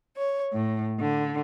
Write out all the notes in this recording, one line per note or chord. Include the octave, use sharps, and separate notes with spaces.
C#5
A2
D3